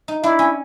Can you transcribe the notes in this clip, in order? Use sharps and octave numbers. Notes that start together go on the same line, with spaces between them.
D#4
D4 E4
C#4